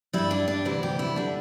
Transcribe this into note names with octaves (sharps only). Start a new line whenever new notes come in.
G2 G3 E4
D4
D4
D2 C3 E3 G3 E4
G4
E4
D3 G3 D4